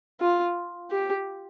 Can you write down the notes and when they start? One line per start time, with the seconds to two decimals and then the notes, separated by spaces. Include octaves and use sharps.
0.21 F4
0.91 G4